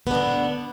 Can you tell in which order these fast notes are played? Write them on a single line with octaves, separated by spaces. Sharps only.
B3 D4 D3